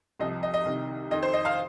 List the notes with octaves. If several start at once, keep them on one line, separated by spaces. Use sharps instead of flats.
C2 C3 F3 D#5
D#5
D#5
C2 C3 D#3
F2 D#3 D#5
C5
D#5
F5